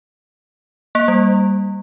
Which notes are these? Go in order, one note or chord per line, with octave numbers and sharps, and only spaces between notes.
A#3
G3